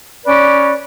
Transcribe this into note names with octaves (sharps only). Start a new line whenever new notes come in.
C#4 B4 D5